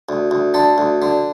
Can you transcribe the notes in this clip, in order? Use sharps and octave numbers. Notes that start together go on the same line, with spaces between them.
D2
D2
D3 A4
D2
D3